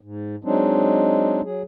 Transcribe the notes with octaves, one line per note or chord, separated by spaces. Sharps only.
G#2
F#3 G#3 C4 D4 D#4
F#3 G#4